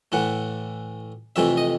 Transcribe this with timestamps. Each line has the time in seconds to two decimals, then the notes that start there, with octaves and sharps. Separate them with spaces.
0.12 A2 E3 A3 F#5
1.36 F2 C3 E3 A3 E5
1.57 D#5